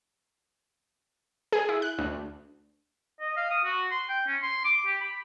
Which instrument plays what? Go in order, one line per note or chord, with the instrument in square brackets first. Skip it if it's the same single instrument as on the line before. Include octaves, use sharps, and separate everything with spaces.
[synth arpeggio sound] G#4
E4
F#6
D2
[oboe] D#5
F5
D#6
F#4
C6
G5
C#4
C6
D6
G4
B5